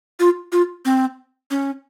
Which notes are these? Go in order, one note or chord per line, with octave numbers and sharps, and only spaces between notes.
F4
F4
C4
C#4